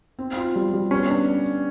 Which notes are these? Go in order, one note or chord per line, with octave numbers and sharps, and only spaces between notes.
C4
F4
G3
G3
B3 C#4
D4